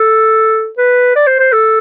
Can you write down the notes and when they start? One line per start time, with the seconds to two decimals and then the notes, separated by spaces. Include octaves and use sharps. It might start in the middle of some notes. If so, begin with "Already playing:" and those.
Already playing: A4
0.78 B4
1.16 D5
1.27 C5
1.40 C5
1.53 A4